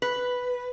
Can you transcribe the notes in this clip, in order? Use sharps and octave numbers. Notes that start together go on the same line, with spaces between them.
B4